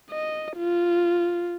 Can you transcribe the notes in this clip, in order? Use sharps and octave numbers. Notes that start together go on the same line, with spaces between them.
D#5
F4